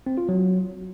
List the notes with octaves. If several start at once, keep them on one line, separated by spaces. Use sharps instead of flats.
C4
F4
F#3